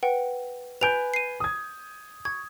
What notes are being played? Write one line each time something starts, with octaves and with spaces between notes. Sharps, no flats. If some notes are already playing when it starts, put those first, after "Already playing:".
B4 F#5 G5
B4 G#5 G6 D7 F7
C7 D#7
D#6 G#6
C#6 G#6